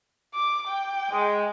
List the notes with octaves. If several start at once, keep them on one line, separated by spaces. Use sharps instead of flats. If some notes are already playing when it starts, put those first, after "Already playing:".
D6
G5
G#3